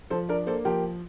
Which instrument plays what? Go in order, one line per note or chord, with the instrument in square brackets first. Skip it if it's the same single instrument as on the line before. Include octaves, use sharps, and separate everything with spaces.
[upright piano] F3 A4 C5
D4 A#4 D5
A#3 A4 C5
F3 G4 A#4